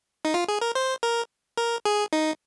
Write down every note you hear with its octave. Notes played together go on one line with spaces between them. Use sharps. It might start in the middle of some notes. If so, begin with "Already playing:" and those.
D#4
F4
G#4
A#4
C5
A#4
A#4
G#4
D#4